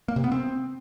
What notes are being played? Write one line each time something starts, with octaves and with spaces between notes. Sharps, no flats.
A#3
C3
B3
C4